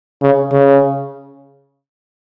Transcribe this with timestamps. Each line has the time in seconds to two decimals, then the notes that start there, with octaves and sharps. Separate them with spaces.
0.21 C#3
0.52 C#3